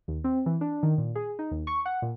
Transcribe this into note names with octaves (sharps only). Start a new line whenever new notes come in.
D#2
C4
E3
D4
D#3
A#2
G#4
D#4
D#2
C#6
F#5
A#2